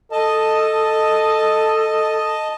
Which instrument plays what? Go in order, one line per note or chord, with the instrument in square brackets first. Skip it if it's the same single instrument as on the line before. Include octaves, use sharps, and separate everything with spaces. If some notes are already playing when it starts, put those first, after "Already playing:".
[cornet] A4 [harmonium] D#5 A5